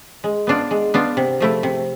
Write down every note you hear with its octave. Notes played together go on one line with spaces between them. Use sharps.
G#3
B3 D4 F4
G#3
B3 D4 F4
C3
F3 A3 E4
C3